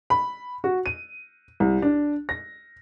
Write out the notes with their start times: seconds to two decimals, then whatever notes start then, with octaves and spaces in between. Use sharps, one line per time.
0.10 B5
0.64 F#4
0.86 D#7
1.60 C2
1.82 D4
2.29 A#6